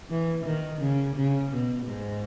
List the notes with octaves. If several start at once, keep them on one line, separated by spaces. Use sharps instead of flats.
E3
D#3
C#3
C#3
B2
G#2